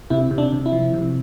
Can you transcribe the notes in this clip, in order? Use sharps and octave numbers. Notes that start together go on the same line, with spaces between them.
C3 E4
C3
D4
C3
E4
F3
C3